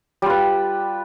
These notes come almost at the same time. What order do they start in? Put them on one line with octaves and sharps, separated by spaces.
G3 F4 B4